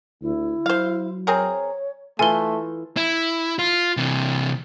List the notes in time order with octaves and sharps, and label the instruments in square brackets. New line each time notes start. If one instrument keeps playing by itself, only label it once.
[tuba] D2 [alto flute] E4
[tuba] F#3 [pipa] C5 F5
[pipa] C4 G#4 A#4 [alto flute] C#5
[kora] E3 F4 A4 [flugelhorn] A3 [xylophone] G#5 G7
[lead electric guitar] E4
F4
C3 E3